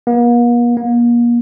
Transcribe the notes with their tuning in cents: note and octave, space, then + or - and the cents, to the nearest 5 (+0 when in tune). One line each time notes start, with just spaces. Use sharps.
A#3 +45
A#3 +35